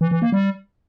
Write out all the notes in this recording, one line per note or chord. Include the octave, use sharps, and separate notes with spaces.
E3
E3
A#3
G3